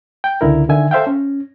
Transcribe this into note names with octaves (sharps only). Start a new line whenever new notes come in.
G5
C#2 D3 E4 A#4
D3 D#3 E5 G#5
A4 C5 E5 F5 G5
C#4